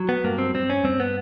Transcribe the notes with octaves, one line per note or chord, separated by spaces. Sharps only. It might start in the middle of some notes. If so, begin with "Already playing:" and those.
Already playing: F#3
B3
G2 A#3
C4
G2 C4
C#4
G2 C4
B3